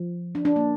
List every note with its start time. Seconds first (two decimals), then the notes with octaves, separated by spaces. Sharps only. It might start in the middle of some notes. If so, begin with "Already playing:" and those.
Already playing: F3
0.35 D4
0.45 D4
0.56 A#3